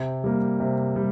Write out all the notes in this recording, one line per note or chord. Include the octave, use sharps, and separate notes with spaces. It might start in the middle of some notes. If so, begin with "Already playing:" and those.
Already playing: C3
G3 A#3
C3
G3